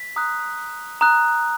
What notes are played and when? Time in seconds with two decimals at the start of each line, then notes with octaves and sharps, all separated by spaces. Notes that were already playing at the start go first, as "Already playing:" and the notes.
Already playing: B6
0.16 A#5 D#6 F#6
1.01 A#5 D#6 F#6